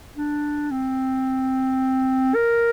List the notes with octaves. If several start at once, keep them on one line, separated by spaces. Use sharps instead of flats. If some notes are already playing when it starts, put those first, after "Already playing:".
D4
C4
A#4